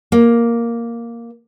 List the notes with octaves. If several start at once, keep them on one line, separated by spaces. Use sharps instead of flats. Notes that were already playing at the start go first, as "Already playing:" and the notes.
A#3